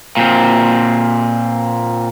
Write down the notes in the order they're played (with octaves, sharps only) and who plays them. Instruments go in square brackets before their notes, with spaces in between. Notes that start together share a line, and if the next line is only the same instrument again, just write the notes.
[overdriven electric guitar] A#2 C4